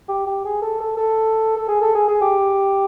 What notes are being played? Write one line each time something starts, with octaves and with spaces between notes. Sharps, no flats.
G4
G4
G#4
A4
A4
A4
A4
G#4
A4
G#4
G#4
G4